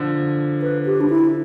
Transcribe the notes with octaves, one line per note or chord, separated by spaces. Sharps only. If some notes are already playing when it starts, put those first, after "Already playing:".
Already playing: D3 F3
B4
G4
D4
E4